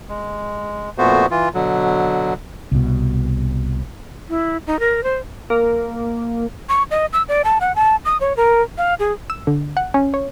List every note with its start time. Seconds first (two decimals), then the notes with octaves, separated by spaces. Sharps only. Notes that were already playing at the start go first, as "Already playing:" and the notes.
0.09 G#3
0.98 F2 A#2 A3 B3 F#4 C5
1.31 E3 F4
1.54 B2 D3 F#3
2.72 C2 B2
4.29 E4
4.67 D#4
4.80 A#4
5.03 C5
5.50 A#3
6.69 C#6
6.91 D#5
7.13 E6
7.29 D5
7.44 A5
7.61 F#5
7.76 A5
8.05 D#6
8.20 C#5
8.37 A#4
8.78 F5
8.99 G#4
9.30 E6
9.47 D3
9.77 F#5
9.94 C#4
10.14 C#5